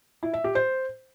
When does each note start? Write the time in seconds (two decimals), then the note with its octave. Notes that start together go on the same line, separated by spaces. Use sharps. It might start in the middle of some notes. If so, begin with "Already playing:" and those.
0.23 E4
0.34 E5
0.44 G4
0.55 C5